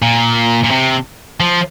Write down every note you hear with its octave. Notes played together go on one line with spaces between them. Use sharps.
A#2
A#2
C3
F3